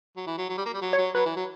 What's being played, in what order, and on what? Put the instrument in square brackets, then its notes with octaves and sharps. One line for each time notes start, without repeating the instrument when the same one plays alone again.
[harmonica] F#3
E3
F#3
F#3
G3
A#3
G3
F#3
[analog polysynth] C#5
[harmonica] F#3
[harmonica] F#3 [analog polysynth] B4
[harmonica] E3
F#3